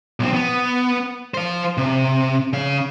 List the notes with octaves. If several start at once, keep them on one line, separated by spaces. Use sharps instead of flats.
B1 C4
B3
C5 F5
C3
C#3 F5